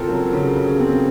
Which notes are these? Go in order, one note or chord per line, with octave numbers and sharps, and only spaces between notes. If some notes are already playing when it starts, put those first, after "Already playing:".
Already playing: C#3 C4 F4 A4 A#4
F#3
C#3
C#3
C4